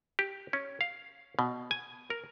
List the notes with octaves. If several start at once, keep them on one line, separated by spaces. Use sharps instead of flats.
G4
C#4
F5
B2
G#5
A#4